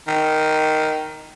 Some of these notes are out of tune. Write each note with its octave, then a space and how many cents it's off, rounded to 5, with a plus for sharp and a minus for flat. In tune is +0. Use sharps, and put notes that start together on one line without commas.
D#3 +0